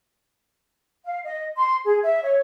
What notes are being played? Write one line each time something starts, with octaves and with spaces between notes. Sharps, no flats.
F5
D#5
C6
G#4
E5
C#5